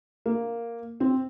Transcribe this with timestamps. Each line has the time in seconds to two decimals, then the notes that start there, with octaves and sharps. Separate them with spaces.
0.26 A#3
1.00 C4